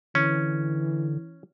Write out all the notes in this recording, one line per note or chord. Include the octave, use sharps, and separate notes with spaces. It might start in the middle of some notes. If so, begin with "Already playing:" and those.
D3 E3 C#4